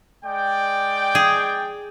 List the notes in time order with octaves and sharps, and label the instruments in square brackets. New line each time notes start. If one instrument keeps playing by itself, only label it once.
[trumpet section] G#3 D5 G5
[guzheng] G#4